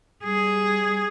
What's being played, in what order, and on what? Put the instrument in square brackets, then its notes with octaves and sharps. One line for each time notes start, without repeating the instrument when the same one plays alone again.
[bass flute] G3 [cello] G#4